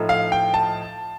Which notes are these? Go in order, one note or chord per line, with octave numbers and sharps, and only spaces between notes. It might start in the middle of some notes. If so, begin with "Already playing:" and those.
Already playing: A2 F3 A3 D#4
F5
G5
A5